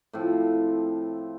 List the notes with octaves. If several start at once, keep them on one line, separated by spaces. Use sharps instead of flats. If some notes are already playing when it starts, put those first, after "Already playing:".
A2 F3 C4